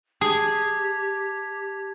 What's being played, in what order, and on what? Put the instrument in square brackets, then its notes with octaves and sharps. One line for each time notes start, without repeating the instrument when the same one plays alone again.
[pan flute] G4 [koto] G#4 [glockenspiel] A5 G#6